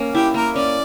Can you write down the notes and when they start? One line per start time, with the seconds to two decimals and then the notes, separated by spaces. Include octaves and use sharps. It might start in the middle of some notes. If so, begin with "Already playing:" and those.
Already playing: A#3 C#4
0.14 E4 G4
0.34 A#3 A#4
0.55 C#4 D5